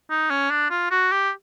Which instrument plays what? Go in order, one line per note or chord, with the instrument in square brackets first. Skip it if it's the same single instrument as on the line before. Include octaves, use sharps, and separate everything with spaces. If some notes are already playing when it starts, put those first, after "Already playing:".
[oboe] D#4
C#4
D4
F4
F#4
G4